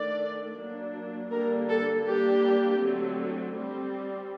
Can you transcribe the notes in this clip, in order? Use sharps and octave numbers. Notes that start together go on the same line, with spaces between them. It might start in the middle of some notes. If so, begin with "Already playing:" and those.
Already playing: D#3 A3 D4 D5
F#3 A#3 D4
D3 G3 A#3 D4 A#4
A4
G3 A#3 D4 G4
D3 F#3 A3 C4
G3 C4